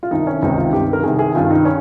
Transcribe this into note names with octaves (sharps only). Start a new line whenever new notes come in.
F4
C2 C3 D#3 D#4
C#4
C#2 C3 D#3 D#4
F4
G2 D#3 G4
A#4
C2 C3 D#3 G#4
G#4
G2 D#3 F4
D#4
C#4